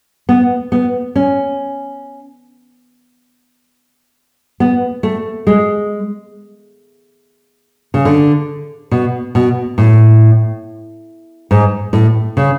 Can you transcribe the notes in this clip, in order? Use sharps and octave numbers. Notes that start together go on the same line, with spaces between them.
B3
B3
C#4
B3
A3
G#3
C#3
D3
B2
B2
A2
G#2
A2
C#3